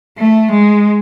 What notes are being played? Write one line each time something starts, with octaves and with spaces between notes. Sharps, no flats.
A3
G#3